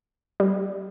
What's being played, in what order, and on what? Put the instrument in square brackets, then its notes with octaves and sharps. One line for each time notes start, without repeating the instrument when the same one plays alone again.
[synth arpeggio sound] G3